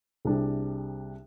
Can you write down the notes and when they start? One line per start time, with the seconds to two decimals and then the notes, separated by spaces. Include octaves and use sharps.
0.25 C2 C3 G3 D4 G#4